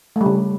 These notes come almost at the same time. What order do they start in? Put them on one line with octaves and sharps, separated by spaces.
A3 G3 C#3